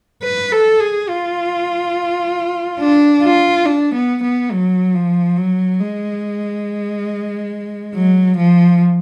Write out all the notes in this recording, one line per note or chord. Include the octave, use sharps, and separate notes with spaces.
B4
A4
G#4
F4
D4
F4
D4
B3
B3
F#3
F3
F#3
G#3
F#3
F3